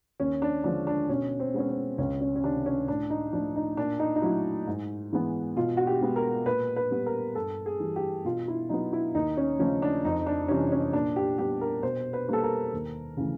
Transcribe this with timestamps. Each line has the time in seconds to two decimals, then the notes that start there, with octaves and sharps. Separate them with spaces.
0.20 D#2 C#4
0.42 D4
0.64 D3 F3 G#3 D4
0.87 D4
1.09 B2 C#4
1.39 C4
1.54 G#3 B3 C#4
1.69 C4
1.98 C#2 C#4
2.21 C#4
2.36 C#4
2.43 C3 D#3 D4
2.66 C#4
2.88 A2 D4
3.10 D#4
3.33 F3 A3 D4
3.56 D#4
3.77 A#2 D4
3.99 D#4
4.16 D#4
4.22 F#3 A3 E4
4.67 G#2
5.13 E3 G#3 B3
5.56 B2 F4
5.77 F#4
5.87 G4
6.01 G#3 B3
6.16 A#4
6.46 A#2 B4
6.76 B4
6.91 G3 B3
7.06 A#4
7.35 G2 A4
7.66 G#4
7.80 E3 G3
7.96 G4
8.25 B2 F4
8.48 E4
8.69 F#3 B3 D#4
8.93 E4
9.14 D#2 D#4
9.37 C#4
9.59 C#3 F3 A3 C#4
9.82 D4
10.05 F2 D#4
10.26 D4
10.48 C3 E3 G3 C#4
10.72 C#4
10.93 A#2 D4
11.16 G4
11.38 G3 B3 G4
11.61 A#4
11.83 B2 C5
12.13 B4
12.28 G3 A#3 A4
12.43 A#4
12.73 D#2
13.17 C#3 E3 A3